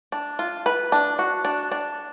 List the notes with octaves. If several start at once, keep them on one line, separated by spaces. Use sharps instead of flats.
D4
F4
B4
D4
F#4
D4
D4